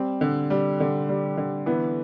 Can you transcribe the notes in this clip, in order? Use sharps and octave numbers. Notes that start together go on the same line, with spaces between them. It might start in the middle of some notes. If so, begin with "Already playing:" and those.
Already playing: G3 C4
D3
G3
D3
G3
D3
E3 B3